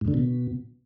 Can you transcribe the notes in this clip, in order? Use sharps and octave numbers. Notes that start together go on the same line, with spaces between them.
G#2
D3
B2